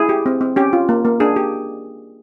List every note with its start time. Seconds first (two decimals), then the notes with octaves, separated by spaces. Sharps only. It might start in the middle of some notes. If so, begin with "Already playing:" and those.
Already playing: E4 G#4
0.09 G4
0.26 C4
0.41 C4
0.56 C#4 G4
0.73 F4
0.89 A#3
1.05 A#3
1.20 D4 G#4
1.36 G4